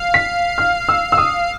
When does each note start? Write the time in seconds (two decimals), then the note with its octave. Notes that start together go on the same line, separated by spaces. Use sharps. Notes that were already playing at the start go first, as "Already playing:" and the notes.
Already playing: F5
0.14 B6
0.58 F6
0.89 E6
1.12 E6
1.18 D#6